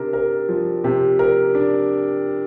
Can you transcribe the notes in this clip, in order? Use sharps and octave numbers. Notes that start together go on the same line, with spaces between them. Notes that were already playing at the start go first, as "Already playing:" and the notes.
Already playing: C3 D4 A#4
A#4
F3
C3
A#4
D4